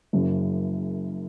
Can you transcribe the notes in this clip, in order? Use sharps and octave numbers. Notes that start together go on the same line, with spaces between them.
F#1 F#2 C#3